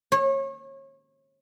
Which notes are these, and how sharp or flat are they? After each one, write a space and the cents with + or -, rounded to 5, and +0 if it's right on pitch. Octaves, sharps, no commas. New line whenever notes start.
C#5 -30